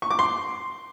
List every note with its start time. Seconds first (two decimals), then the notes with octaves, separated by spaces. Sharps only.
0.02 C#6
0.10 D6
0.19 C6